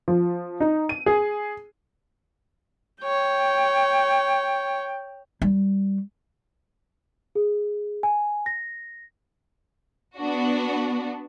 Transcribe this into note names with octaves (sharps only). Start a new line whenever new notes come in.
F3
D#4
D#7
G#4
C#5 G5
G3
G#4
G#5
A#6
B3 D4 F#4